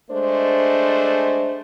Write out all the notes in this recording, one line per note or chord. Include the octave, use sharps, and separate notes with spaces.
G#3 A3 D4 C5